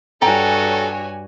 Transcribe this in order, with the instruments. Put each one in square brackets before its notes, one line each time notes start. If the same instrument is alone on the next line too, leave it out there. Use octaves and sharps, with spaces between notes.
[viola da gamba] G2 F#4 [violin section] G4 C#5 G#5 [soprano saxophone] A4 [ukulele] G5 A#5